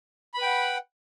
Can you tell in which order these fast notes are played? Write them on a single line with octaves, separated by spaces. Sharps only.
B5 B4 G5 F#5